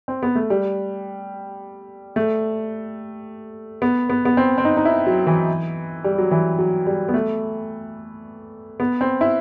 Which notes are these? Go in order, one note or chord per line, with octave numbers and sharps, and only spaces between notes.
C4
B3
A3
G3
A3
B3
B3
B3
C4
C4
D#4
D#4
E4
F#3
E3
G3
F#3
E3
F#3
G3
B3
A3
B3
C4
E4